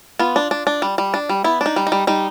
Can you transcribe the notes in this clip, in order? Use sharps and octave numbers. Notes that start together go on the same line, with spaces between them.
B3 F4
D4
D4
D4
G3
G3
D4
G3
B3 E4
D4 D#4
G3
D#4
G3
G3 D#4